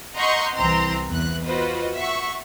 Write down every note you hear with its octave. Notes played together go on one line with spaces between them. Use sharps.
D#5 F#5 A#5 C6 C#6 G6
C2 E3 C4 A#5 C6
E2 F#6
F4 F#4 B4 C5 D#5
E5 F#5 C#6